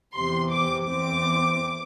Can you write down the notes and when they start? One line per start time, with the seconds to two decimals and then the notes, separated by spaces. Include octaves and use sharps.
0.14 E2 C3 E3 C6
0.51 D6
0.87 E2 E3 C4 D6